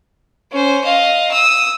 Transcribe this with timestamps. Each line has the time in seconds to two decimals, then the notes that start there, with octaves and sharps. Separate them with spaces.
0.52 C#4 C5
0.84 D#5 F5
1.31 D#6 E6